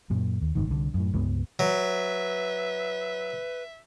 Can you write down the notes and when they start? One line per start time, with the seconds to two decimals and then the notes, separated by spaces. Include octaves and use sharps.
0.10 F#2 A#2
0.41 D#2
0.55 F#1 B1 G#2 D#3
0.67 C2 D3
0.94 F#2 A2
1.13 C#2 G2 G#3 B3
1.59 F#3 B4 E5